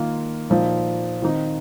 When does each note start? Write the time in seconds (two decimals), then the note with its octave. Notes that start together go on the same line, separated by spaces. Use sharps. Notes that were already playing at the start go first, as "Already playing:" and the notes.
Already playing: D#3 A#3 F4
0.50 A#2 F3 D#4
1.22 D#3 C4 D#4